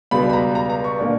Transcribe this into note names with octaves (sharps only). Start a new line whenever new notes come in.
C#2 B2 G3 B5
B5
A#5
A#5
A#5
C#6
A#2 A#3 D4